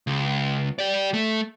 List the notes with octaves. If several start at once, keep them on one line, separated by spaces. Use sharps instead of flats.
C#2
G4 D5
A3